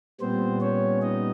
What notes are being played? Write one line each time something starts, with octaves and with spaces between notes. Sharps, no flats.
A#2 G3 B3 C4 C5
C#4 C#5
D#4 D#5